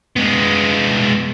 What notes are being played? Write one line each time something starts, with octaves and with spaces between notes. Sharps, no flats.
G#3 B3